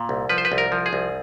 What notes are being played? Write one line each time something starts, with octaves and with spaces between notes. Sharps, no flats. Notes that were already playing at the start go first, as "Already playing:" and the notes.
Already playing: A#2
C2
F3 B4
C5
B4
C2
A#4
F3
G#4
C2